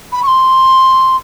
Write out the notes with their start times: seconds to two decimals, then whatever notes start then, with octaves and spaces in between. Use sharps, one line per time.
0.12 B5
0.22 C#6
0.26 C6